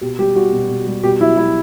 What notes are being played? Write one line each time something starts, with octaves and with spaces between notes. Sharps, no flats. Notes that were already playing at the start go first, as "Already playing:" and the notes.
B2 G4
G3 G4
G3 F#4
B2
B2
G3
B2 G4
F#3 E4
F#3 E4